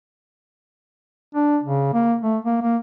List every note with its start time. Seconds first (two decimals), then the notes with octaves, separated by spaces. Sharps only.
1.35 D4
1.63 C#3
1.93 A#3
2.21 A3
2.45 A#3
2.62 A#3